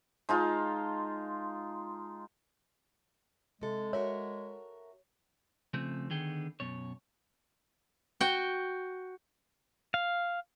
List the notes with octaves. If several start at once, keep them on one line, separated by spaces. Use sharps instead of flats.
G#3 D#4 F4 A5
C3 G#3 A4
F#4 A#4 C#5 E5
C#3 F3 A3 C4
D3 D#3 B3 G#4 G5
F#2 B2 C#5
F#4 G5
F5